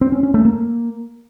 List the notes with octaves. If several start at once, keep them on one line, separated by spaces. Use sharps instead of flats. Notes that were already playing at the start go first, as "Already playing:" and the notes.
C4
C#4
C#4
A3
A#3